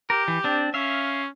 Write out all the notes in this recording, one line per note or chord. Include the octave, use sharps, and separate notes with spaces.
G4 A#4
E3
C4 D4
C#4 E5 F5